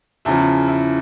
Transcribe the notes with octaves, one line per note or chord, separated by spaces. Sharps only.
E2 C#3 F3 E4
E4